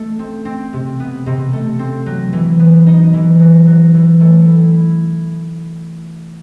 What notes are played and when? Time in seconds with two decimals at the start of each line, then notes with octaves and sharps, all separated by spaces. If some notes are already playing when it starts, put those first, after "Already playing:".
Already playing: A3
0.19 C4
0.45 C4
0.73 C3
1.00 B3
1.26 C3
1.53 A3
1.79 C4
2.06 F#3
2.33 E3
2.59 B3
2.86 D#4
3.13 E3
3.40 F#3
3.67 F#3
3.94 E3
4.20 A3
4.47 E4
4.74 E4